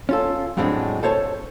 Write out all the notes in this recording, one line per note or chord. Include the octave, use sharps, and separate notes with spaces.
C#4 F4 A4
F2 A2 F#3 G#3 C4 D4
A4 C5 C#5 A5